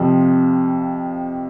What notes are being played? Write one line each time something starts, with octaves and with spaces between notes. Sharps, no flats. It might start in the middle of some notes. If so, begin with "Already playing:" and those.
Already playing: F2 C3 F3